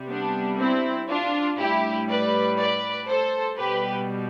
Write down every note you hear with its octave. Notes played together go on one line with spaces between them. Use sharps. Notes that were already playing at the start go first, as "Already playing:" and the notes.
Already playing: C3 G3
B3 D4
C4 E4
D4 F4
A2 G3 E4 G4
B4 D5
B4 D5
A4 C5
B2 G3 G4 B4